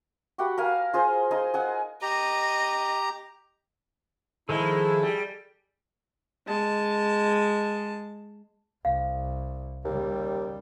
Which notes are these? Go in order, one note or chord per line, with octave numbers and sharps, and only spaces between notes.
F#4 G4 F#5 B5
A#4 F5 G#5
F4 G#4 C5
D#4 G#4 A#5 C6
G#4 F#5 G#5
G4 D#5 A#5
D#3 F3 G#3 E4 A4
G3
G#3 A5
C2 F5
D#2 C#3 G3